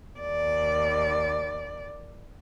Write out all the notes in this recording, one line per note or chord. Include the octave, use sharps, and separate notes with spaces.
D#2 D5